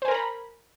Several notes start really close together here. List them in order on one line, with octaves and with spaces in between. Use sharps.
C5 G#5 A#4 A#5 B5